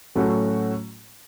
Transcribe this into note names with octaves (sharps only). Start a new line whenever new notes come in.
A2 F#3 A3 C#4 F#4